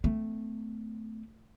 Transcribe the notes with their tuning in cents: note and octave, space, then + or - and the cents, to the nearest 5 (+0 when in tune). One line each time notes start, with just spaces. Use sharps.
A3 +0 C4 -45